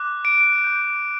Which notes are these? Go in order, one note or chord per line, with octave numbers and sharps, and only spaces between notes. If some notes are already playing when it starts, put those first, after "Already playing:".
Already playing: D6 F#6
D7
D6 G6